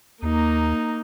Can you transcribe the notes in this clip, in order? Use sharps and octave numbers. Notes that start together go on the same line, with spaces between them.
D#2 A#3 D#4